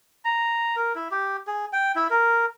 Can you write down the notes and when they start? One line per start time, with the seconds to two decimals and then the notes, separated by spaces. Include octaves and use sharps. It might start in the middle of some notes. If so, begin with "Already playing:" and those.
0.25 A#5
0.76 A#4
0.96 E4
1.11 G4
1.47 G#4
1.73 G5
1.96 E4
2.10 A#4